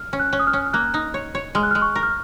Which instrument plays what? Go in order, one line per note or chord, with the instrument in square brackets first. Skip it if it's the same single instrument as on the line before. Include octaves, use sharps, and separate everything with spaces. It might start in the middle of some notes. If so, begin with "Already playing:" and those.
Already playing: [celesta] F6
[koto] C#4
[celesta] F#6
[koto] C#4
[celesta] D#6
F6
[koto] C#4
[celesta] F6
[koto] A#3 [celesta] F#6
[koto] D#4
C#5
C#5
[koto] G#3 [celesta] F6
[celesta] F#6
[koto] G#3 [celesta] F6
[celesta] C#6
[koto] A#4
[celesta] F6